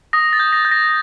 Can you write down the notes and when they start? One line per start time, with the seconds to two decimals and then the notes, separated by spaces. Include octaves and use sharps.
0.13 D#6 A#6
0.33 A6
0.40 G6
0.53 A#6
0.65 G6
0.72 A#6